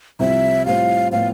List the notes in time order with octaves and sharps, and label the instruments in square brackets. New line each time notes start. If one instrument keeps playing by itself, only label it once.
[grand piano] C2 C3 F3 C4 [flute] E5
[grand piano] A2 G3 C4 F4 [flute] F5
[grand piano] A2 F3 B3 [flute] F5